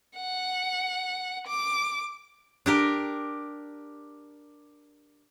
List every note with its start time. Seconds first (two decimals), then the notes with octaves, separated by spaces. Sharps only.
0.16 F#5
1.47 D6
2.66 D4 G4 A#4